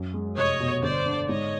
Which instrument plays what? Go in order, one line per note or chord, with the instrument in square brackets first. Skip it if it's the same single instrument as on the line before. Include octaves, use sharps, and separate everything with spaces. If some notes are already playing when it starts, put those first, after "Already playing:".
Already playing: [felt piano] F#2
G#3
[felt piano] F1 [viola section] C#5 D#5
[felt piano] B2
[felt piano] G1 [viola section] C5 D5
[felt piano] D3
[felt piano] G#2 [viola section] C#5 D#5